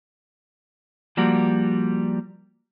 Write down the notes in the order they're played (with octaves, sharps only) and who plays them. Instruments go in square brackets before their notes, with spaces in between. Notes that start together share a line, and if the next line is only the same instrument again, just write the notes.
[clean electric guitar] F3 G3 A#3 F#4